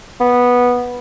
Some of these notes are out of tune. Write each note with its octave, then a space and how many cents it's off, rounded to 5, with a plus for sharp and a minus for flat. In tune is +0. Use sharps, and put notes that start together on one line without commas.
B3 -10